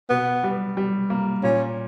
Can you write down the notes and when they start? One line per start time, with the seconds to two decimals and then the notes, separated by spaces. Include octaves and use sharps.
0.10 B2 B3
0.44 G3
0.77 G3
1.10 A#3
1.43 A#2 C#4